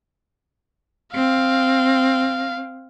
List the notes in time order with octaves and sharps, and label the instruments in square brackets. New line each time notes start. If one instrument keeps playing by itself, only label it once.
[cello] C4 [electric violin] F5